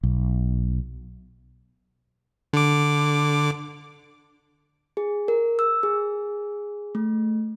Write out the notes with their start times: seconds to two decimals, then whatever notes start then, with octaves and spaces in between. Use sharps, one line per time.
0.03 B1
2.53 D3 D6
4.97 G#4
5.28 A#4
5.59 E6
5.83 G#4
6.95 A3